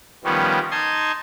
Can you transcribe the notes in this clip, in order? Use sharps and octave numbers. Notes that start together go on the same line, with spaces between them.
D#3 F3 G3 B3 C#4
D#4 A5 C6 D#6 G#6